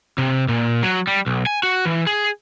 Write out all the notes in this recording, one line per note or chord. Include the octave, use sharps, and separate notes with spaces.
C3
A#2
F#3
G3
B1
G#5
F#4
E3
G#4